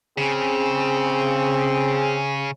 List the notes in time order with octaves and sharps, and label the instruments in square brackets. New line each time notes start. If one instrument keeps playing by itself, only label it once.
[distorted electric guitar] C#3 [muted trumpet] C4 [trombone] G#4